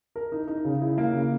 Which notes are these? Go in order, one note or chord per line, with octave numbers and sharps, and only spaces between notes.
A#4
D#4
D#4
C#3
E4
A#3
C#3